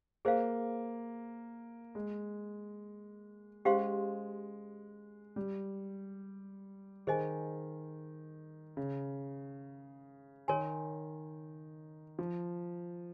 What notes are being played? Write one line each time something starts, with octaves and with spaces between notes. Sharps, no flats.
A#3 G#4 C5 F5
G#3
G#3 C#4 G4 C5 F5 C6
G3
D#3 G#4 C5 D#5 G#5
C#3
D#3 A#4 C#5 G#5 C6
F3